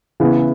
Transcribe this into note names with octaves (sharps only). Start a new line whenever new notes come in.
C#3 E3 B3 E4